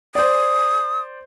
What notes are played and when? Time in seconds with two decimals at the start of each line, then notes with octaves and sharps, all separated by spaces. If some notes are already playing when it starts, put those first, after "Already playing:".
0.15 C5 D5 D#6